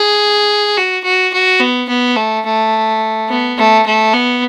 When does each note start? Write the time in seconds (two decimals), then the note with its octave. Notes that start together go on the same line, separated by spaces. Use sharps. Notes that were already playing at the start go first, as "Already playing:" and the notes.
Already playing: G#4
0.77 F#4
1.04 F#4
1.33 F#4
1.60 B3
1.89 B3
2.16 A3
2.45 A3
3.29 B3
3.58 A3
3.86 A3
4.14 B3